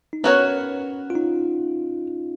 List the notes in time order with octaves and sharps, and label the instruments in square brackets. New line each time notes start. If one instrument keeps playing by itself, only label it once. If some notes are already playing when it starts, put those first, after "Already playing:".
[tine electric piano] D#4
[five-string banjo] B3 F#4 A#4 C#5 [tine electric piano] C#4
[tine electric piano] F4
D#4